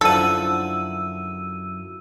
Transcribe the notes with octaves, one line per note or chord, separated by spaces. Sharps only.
F#2 D3 F3 E4 A4 F#5 E6 D#7